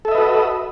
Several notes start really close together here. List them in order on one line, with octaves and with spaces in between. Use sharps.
A4 E5 D#5 B4 F#4